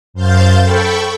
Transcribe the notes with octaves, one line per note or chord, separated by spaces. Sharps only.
F#2 C5 F5 G6 A6
A4 G5 B5 C#6